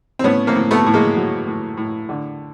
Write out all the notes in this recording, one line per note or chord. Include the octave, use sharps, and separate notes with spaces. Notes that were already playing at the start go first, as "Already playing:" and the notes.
C4
A2 B3 C#4
A#3 C4
A2
A3 B3
A2
G#3 A#3
F#3
A2
A2
D3